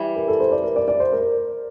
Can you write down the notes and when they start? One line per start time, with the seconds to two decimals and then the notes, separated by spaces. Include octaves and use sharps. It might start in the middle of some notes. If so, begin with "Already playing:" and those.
Already playing: E3 G3
0.16 A#4
0.28 A4
0.40 C5
0.52 D5
0.64 A#4
0.76 D5
0.88 D5
1.00 C5
1.13 A#4